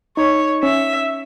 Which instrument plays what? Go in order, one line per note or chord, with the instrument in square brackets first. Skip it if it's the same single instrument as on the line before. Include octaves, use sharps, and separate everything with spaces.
[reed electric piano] D#4 [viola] C#5
[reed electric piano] C#4 [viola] E5